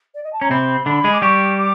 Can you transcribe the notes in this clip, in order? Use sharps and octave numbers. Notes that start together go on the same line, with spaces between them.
D5
D#5
A5
C#4 A#5
C3 C4 B5
D3 D4 B5
G#3 G#4
D6
G3 G4 C#6
D6